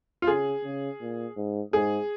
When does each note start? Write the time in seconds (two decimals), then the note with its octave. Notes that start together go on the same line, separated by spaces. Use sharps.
0.22 F4
0.27 C#3 G#4
0.64 C#3
1.01 A#2
1.37 G#2
1.73 G#2 G#4